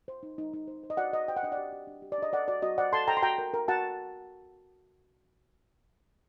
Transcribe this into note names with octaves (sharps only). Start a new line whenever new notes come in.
C5
D#4
D#4
D#4
C5
C5
D#5
F#4 D5 F#5
C5 D#5
C5 G5
F#5
D4 D#5
D5 F#5
G4
G4
D4
G4
D5
D4 D#5
A4 D5 F#5
F#4 D5
F#4 D#5
C5 D5 F#5
A4 A5 C6
A4 G5 A#5
C6
F#4 G5 A#5
A#4
A#4
F#4 F#5 A5